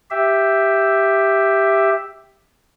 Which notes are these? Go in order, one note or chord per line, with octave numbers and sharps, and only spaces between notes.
G4 E5